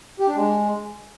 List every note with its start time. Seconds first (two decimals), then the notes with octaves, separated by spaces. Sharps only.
0.20 G4
0.28 D4
0.36 G#3